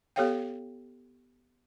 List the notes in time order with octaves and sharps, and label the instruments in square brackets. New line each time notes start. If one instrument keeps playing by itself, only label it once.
[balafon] B3 G4 A4 C#5 F5 G5